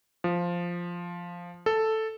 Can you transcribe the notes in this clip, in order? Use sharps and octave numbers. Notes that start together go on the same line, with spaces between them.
F3
A4